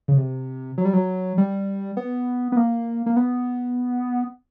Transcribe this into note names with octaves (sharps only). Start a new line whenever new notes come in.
C#3
C3
F#3
G3
F#3
G3
B3
B3
A#3
A#3
B3